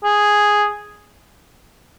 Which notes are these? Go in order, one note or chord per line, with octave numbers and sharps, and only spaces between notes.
G#4